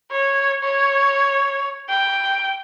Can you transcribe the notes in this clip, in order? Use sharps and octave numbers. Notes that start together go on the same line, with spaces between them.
C#5
C#5
G5